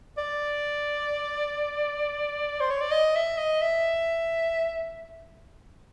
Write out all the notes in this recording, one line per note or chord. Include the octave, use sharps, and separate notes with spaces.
D5
C5
C#5
D5
D#5
E5
D#5
E5